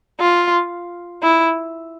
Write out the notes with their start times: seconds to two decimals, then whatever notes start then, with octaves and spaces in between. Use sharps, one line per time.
0.20 F4
1.23 E4